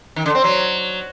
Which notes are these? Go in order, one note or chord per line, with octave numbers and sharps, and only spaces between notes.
D#3
D3
C4
F#3